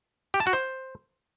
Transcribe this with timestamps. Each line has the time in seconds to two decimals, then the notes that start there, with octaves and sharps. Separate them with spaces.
0.34 G4
0.40 A5
0.47 F#4
0.53 C5